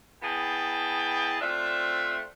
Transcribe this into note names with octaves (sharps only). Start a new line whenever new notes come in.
B3 E4 G#4 D#5 G5 A5
A3 C4 D4 F4 E5